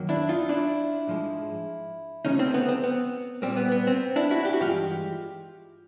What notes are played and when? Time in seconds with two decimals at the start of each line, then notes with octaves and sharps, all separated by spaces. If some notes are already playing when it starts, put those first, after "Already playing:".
Already playing: F#2 D#3 F#3 A#3
0.09 D4 E4
0.29 D#4 F4
0.49 D4 E4
1.07 G#2 F3 G#3
2.25 D2 C#3 F3 A3 C#4 D#4
2.39 C4
2.54 B3
2.69 C4
2.84 B3
3.42 A#2 G3 A#3 C4
3.57 B3
3.72 B3
3.87 C4
4.16 D4 E4
4.31 E4 F#4
4.45 G4
4.53 F#4
4.60 G2 E3 G#3 F4 G4